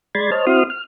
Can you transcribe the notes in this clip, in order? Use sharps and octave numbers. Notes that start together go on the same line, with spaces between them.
G#3 D5 B5 C6 G#6 A6
C5 C#5 D#5 A5 F6
C4 E4 F#4 C6 D#6 F6
F6